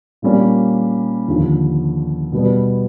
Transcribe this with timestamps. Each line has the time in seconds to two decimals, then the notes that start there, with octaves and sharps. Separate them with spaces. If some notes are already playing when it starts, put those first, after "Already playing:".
0.22 A#2 G3 A#3 C#4
1.28 D#2 D3 F3
2.33 B2 G3 B3